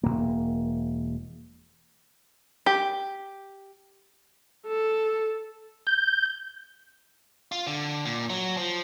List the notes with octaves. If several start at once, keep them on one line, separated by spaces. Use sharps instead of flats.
E1 E2 A#3
G4
A4
G6
F4
D3
A#2
F#3
F3